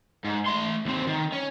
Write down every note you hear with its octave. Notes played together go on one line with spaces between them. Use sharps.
G#2
A3 C6
D#2 C4
D#3
C#4